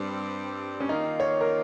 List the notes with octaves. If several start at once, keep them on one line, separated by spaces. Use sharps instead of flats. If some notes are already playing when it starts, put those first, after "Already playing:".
Already playing: G2 G3 C4
C#4
D#3 A#3 D#4 F4
C#5
A#4